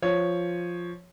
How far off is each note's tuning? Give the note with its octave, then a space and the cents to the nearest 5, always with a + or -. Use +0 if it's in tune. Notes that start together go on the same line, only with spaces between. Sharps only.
F3 +0 C#5 +0